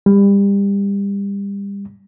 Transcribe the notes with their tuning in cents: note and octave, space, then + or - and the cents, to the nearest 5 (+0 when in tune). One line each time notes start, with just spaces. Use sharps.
G3 +30